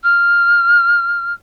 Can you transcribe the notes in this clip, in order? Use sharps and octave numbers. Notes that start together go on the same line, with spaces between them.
F6